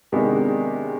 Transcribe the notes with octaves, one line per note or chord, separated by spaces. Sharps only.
C3 D#3 G#3 B3 D4